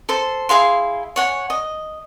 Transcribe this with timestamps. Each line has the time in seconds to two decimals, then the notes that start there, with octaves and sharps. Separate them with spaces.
0.09 A4 C5 C6
0.49 E4 G#4 F5 C6
1.16 C#5 F#5 G#5
1.50 D#5